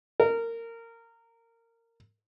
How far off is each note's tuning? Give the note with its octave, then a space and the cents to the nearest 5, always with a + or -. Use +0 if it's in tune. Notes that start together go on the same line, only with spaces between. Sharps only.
A#4 -20